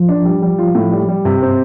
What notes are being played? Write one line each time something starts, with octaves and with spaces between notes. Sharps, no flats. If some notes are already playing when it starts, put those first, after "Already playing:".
Already playing: F3
D4
G3
G3
F4
A2
G3
G3
G2 C3
C4